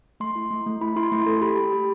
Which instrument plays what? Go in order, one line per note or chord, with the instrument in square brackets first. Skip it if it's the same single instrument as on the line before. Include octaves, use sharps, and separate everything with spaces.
[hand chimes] A3 C6
E4
A3
A3
E4 B5
E4 C6
A3 C6
A4
G4 B5
G4
G4